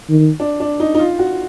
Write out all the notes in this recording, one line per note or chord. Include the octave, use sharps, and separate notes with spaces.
D#3
D4
D4
D#4
D#4
F4
F#4